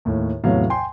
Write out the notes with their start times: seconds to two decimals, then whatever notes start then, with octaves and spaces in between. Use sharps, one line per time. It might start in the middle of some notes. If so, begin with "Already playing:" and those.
0.05 D#2 A2
0.44 E2 A2 C3 F#3 F5
0.70 G5 G#5 C6